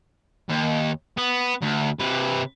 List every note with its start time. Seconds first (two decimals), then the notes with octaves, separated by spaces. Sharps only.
0.49 D#2
1.18 B3
1.62 D2
2.00 C3 B4